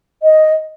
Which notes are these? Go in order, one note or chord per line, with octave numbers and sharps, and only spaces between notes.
D#5